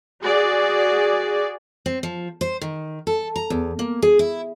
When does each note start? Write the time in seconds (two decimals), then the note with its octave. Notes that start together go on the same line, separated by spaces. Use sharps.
0.23 F#4 G#4 D5
1.86 C4
2.03 F3
2.41 C5
2.61 D#3
3.07 A4
3.36 A#5
3.50 E2
3.79 A#3
4.02 G#4
4.19 E4